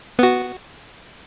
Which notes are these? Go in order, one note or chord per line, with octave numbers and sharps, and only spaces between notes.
B3 F#4